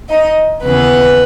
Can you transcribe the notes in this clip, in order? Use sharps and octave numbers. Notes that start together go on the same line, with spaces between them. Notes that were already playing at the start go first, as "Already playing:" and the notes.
D#4 D#5
D#2 C#3 E3 B3 B4